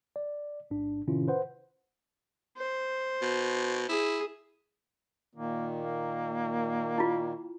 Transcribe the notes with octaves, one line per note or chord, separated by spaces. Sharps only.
D5
A1 G#2 D4
A2 C3 D#3 C#4 E4 F4
B4 C5 F#5
C5
B2
E4 G#4
A#2 D#3 A#3
A#3
E4 F4